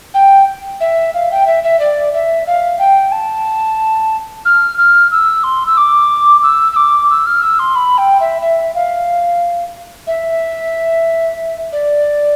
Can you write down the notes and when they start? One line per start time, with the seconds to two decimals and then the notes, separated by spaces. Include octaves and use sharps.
0.14 G5
0.80 E5
1.14 F5
1.31 G5
1.47 E5
1.64 E5
1.80 D5
2.14 E5
2.47 F5
2.79 G5
3.12 A5
4.45 F6
4.78 F6
5.11 E6
5.44 C6
5.66 E6
5.77 D6
6.43 E6
6.72 E6
6.76 D6
7.10 E6
7.26 F6
7.42 E6
7.59 C6
7.75 B5
7.98 G5
8.20 E5
8.41 E5
8.75 F5
10.07 E5
11.72 D5